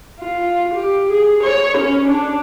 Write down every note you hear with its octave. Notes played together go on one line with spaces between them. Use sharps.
F4
G4
G#4
C#5
C#4
D4